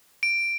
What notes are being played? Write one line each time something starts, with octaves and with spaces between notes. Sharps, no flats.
D7